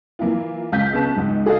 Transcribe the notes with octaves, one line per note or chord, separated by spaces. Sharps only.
E3 A#3 E4 F4
C#2 F5 G6 B6
C#3 B3 A5 F#6
C#2 G#2
G#4 A4 D#5 F5